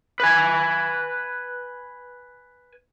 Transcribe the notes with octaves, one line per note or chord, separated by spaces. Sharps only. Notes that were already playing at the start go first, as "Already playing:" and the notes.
B4 G#5